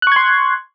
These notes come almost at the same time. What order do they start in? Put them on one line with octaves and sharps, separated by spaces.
F#6 C#6 G#6 C6